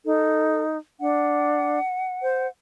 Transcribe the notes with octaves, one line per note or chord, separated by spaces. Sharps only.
D#4 A4
D4 F#5
C5